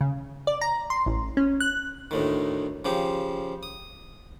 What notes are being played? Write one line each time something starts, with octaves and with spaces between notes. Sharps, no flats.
C#3
D5
A#5
C6
A1
C#4
F#6
D2 A2 D#3
C#3 F3 G4
D#6